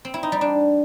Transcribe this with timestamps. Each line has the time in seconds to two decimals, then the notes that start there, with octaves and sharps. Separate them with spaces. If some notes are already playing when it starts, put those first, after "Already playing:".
0.05 C4
0.14 E4
0.23 D#4
0.32 G3
0.41 D4